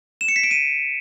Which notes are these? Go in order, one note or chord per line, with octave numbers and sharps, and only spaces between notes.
E7
C#7
B6
D7
D#7